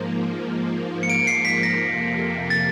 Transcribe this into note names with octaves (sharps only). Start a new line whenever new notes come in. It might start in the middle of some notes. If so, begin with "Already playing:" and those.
Already playing: G#2 F3 A#3
C#7
D7
C7
B6
A#6
F2 C3 F3 A#3
A6